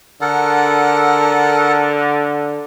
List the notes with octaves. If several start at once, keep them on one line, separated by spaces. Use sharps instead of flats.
D3 A4 A#4 F#5